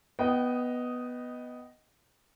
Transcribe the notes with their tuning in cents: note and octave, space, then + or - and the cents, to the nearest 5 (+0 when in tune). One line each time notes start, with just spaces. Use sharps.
B3 +0 D#5 +0 G5 -25